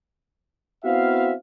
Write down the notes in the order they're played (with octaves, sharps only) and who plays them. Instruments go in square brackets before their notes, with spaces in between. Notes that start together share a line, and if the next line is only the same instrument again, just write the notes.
[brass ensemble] B3 C4 E4 F#4 E5 F5